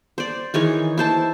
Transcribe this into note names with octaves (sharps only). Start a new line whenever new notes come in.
C5 D5
D#3 E3 G#4 C#5
E4 C5 A5